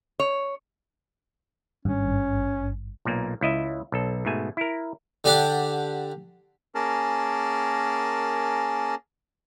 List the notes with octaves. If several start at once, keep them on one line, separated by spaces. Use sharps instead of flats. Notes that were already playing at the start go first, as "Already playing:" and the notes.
C#5
G#1 G2 C#4
B1 A#2 A#3
C#2 E4 D#5 E5
B1 A4
G#2 B2 A3 G#5
E4 A#4
D3 D4 G4 D5 F#5
A#3 C#4 G#4 A#4 A5